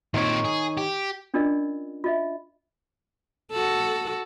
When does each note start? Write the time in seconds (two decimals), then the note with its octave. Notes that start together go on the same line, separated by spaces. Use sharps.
0.14 A#2 D#3 C4 D#4 C#5
0.45 G#4
0.78 G4
1.34 C#4 D4 F4 A#4 D5 D#5
2.04 F4 D#5 E5
3.52 F#4 A4